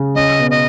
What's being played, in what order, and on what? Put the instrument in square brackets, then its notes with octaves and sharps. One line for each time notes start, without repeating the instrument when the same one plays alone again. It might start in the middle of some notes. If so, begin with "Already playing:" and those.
Already playing: [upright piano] C#3
[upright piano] C#4 [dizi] D#5
[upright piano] B2
[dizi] D#5